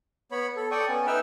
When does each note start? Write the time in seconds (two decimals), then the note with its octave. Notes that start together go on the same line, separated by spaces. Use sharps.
0.32 B3 C#5 B5
0.56 A4
0.71 A4 D5 G5 C#6 D#6
0.89 B3 C#4
1.07 D#4 B4 E5 G5 E6 F6